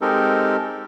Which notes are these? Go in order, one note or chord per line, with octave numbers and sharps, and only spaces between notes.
G#3 C4 D#4 G4 A4 A#4